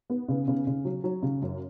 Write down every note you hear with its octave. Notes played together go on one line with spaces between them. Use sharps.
B3
C#3
C#3
C#3
F#3
F#3
C#3
F#2